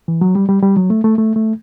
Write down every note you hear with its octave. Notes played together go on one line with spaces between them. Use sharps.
E3
F#3
G3
G3
G3
F#3
A3
A3
A3
A3